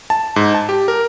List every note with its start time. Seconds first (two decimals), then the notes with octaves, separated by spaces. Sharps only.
0.10 A5
0.36 G#2
0.55 A5
0.69 G4
0.88 A#4